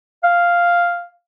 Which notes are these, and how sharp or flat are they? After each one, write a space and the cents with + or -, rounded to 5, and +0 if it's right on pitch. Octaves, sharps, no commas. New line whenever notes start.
F5 +0